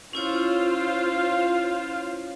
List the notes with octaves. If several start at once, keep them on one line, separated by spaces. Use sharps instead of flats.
C#4 E4 F4 C5 C#5 F5